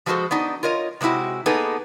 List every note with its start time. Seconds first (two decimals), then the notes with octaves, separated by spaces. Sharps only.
0.06 F3 F#3 G#3 F#4 A4 C5
0.31 B3 D4 D#4
0.63 F4 A#4 C#5 D#5
1.01 C3 G#3 C4 E4 F#4
1.46 A#3 B3 D#4 G#4 A4